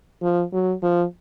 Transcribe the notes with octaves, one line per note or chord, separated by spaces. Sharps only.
F3
F#3
F3